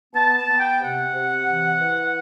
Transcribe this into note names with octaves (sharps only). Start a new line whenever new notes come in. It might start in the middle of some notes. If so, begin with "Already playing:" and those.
B3 A5
A5
B3
G5
C3 F#5
C3
E3
E3